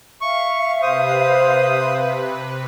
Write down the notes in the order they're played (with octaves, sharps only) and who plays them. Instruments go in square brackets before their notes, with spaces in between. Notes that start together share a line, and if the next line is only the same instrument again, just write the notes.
[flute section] E5 F5 [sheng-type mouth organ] C#6
[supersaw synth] C3 B4 [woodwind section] C5 [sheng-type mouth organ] D#6